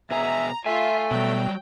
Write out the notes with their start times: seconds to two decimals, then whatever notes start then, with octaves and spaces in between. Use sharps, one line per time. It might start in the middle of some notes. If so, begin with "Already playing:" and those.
0.11 B2 G#4 E5 G#5 A#5
0.66 A3 F4 E5 G#5
1.11 B2 F#3 G3 G5